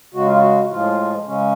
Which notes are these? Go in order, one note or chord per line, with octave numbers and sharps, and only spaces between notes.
C#3 G#3 F#4
F4
F#4
A2 F3 G#3 F4
C#3 G#3 C#4